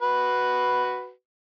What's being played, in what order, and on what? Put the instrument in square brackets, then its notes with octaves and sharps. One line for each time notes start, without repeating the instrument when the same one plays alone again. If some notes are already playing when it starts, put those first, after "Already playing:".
[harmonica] F#4 B4